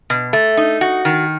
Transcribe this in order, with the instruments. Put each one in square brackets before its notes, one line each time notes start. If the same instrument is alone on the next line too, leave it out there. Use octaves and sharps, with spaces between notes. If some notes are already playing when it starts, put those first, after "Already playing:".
[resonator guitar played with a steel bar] B2
A3
D#4
F#4
D#3